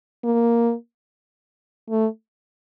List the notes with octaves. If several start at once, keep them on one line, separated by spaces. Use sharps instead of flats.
A#3
A3